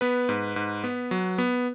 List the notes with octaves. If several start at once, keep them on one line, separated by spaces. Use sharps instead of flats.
B3 B4
G#2
G#2
B3
F#3
B3